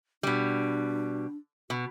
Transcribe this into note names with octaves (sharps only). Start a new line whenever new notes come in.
B2 G3 D4
B2 F#4